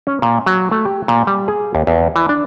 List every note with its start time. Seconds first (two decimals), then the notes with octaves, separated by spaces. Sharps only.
0.07 C#4
0.22 A#2
0.46 F#3
0.71 A3
0.85 G4
1.08 A#2
1.27 G3
1.48 G#4
1.75 D#2
1.87 E2
2.16 E3
2.29 D4